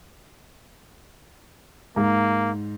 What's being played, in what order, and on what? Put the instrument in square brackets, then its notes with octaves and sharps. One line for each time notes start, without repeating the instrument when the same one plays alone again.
[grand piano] G#2 [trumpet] A#3